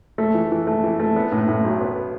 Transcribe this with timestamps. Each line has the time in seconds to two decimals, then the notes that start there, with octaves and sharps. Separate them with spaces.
0.18 A3
0.34 E3
0.52 E3
0.67 A3
0.83 E3
1.00 A3
1.16 B3
1.32 A2
1.48 A2
1.64 B1
1.81 B3